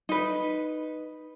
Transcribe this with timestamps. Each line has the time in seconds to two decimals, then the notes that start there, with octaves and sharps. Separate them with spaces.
0.09 D#4 B4